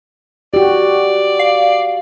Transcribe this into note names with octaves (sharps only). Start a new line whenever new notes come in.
F#4 G4 D5
F5